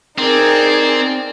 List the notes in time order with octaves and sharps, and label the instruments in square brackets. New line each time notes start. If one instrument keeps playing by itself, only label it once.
[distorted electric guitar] C4 [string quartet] D#4 G#4 [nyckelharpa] A#4 D5